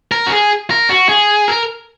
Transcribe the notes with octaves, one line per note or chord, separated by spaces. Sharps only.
A#4
F#4
G#4
A#4
F#4
G#4
A#4